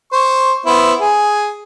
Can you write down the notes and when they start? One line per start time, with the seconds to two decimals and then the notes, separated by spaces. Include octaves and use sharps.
0.13 C5 C#6
0.66 B3 E4 C5
1.00 G#4